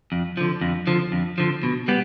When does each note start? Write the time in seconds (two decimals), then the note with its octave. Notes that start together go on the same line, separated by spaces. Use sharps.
0.12 F2
0.37 D3 F3
0.61 F2
0.87 D3 F3
1.12 F2
1.38 D3 F3
1.63 B2
1.88 G3 B3